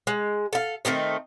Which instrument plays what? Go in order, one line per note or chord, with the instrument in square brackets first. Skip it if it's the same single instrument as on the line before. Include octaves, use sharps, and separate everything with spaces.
[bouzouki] G#3
A4 F5
D#3 A3 C4 D#4